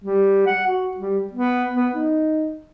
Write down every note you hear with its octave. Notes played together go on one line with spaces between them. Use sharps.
G3
F#5
F#4
G3
B3
B3
D#4